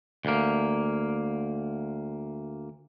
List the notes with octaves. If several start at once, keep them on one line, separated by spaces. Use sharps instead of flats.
D2 A#3